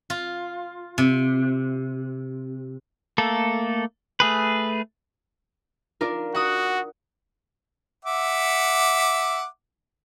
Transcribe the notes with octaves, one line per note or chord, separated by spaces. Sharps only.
F4
C3
A3 A#3 A4
A3 G#4 B4
D4 F4 A#4
F#4 F#5 D#6
E5 F#5 D6